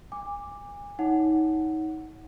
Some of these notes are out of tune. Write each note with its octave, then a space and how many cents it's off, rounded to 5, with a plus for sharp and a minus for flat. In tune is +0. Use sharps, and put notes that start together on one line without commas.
G#5 -30 D6 +0
D#4 +25 C#5 +15 F#5 +0